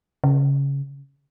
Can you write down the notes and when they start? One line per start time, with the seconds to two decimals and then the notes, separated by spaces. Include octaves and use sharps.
0.24 C#3